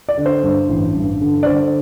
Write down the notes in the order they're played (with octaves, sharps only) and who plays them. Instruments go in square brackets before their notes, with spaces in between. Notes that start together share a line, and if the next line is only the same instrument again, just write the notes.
[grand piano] D5
D3
C5
G2
A1
G2
D3
D5
D3 C5